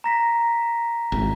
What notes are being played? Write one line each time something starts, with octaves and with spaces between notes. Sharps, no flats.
A#5 A#6 B6
G#1